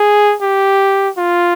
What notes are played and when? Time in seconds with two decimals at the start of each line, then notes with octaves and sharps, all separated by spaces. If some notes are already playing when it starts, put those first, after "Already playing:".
Already playing: G#4
0.41 G4
1.17 F4